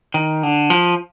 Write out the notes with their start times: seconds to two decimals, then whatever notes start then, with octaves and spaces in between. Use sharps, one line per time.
0.14 D#3
0.43 D3
0.70 F3